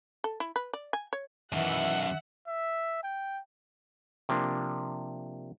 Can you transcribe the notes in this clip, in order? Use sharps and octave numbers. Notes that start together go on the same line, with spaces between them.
A4
E4
B4
D5
G#5
C#5
F#2 D#3 E3 E5 F#5
E5
G5
C3 F3 A#3 D4